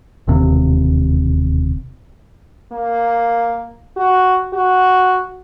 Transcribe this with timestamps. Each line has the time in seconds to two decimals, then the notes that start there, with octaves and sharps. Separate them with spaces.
0.28 E1 D#2 C3
2.72 A#3
3.97 F#4
4.53 F#4